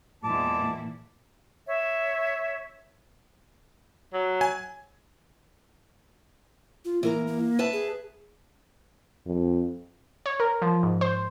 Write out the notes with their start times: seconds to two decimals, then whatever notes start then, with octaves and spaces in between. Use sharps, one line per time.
0.24 E2 A#2 E3 G#3 E4 A5 D6
1.66 C#5 E5
4.13 F#3
4.41 G#5
6.85 F4
7.03 E3 A#3 A#4 A#5
7.27 A#3
7.59 B4 E5 A5
7.73 G#4
9.26 F2
10.26 C#5
10.40 A#4
10.62 F3
10.83 G#2
11.01 C5